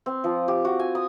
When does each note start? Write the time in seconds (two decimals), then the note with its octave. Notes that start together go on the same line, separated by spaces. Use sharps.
0.06 C4
0.24 F3
0.48 G4
0.65 F#4
0.79 G#5
0.95 D#6